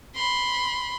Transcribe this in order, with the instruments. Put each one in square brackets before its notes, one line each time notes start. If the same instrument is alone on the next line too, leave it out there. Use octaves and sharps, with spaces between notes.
[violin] B5 C6